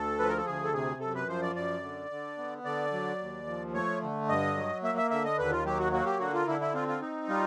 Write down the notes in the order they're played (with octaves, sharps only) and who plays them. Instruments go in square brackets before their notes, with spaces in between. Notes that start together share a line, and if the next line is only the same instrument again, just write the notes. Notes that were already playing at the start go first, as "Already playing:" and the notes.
Already playing: [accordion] D2 A4
F3 B4
A#4
A4
D2 G#4
A4
C3 G#4
F#2 A4
B4
F3 C5
D5
F#2 D5
D3
D3
B3
D3 D5
F#3
D#2
F3
A3 C#5
D3
G2 D#5
F#3
A#3 E5
E5
D3 E5
D#5
D#2 B4
F4
F#3 G4
F#4
A#3 F#4
G4
D3 F#4
F4
D3 E4
E4
C4 F4
F4
D#4
G3 F4